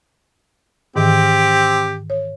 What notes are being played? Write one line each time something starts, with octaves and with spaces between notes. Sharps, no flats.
G#2 D#3 E3 C4 G4
C#5